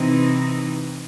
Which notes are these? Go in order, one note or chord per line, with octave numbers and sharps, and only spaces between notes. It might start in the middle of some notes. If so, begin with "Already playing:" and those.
Already playing: C3 E3 C4 D#4